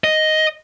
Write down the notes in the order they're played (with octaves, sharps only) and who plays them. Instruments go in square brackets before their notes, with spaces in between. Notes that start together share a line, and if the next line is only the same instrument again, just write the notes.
[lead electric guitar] D#5